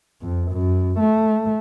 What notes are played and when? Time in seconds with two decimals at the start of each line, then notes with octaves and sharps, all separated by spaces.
0.21 F2
0.51 F#2
0.99 A3